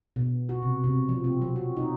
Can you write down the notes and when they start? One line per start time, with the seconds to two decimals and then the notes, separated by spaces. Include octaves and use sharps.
0.16 B2
0.49 F#4
0.63 C3
0.84 C3
1.09 F3
1.24 C4
1.42 F#3
1.56 F#4
1.77 D#4